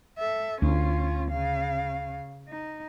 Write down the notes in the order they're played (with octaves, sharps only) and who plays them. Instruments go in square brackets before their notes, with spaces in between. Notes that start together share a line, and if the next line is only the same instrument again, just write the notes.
[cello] A4 E5
[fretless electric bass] D2 [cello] C#4 F4
[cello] C#3 F5
D#4